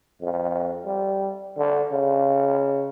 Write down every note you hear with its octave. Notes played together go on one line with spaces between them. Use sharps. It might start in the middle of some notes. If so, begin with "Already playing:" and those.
F2
G3
D3
C#3